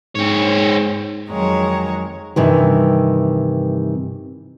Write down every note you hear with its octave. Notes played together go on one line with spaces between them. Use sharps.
G#2 C4 C#5
F2 D#3 F#3 G#3 C#5 A#5
G2 C3 D#3 E3